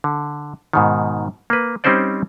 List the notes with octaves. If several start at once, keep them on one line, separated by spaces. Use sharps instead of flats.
D3
G#2 B2 D#3
A#3 B4
G3 C4 C#4 D#4 C5 D5